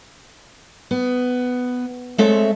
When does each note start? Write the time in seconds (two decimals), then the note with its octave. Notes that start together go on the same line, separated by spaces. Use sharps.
0.91 B3
2.18 G#3 A3 C4 A4 C#5 E5